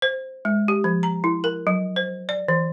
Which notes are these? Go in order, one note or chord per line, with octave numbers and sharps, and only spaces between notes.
C5
G#3
G4
F3
A#5
E4
A#4
F#3
C5
D5
E3